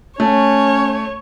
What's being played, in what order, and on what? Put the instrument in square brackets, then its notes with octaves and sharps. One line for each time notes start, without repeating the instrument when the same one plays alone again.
[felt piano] A3 [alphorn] C#4 [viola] C#5